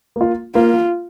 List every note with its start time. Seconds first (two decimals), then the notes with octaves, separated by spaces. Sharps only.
0.16 A#3 F4
0.55 A#3 F4